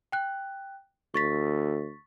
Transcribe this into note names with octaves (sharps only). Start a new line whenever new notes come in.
G5 F#6
D2 C#6 A6 B6